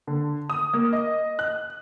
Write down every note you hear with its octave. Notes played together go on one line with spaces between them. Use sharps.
D3
D#6
A#3
D#5
F#6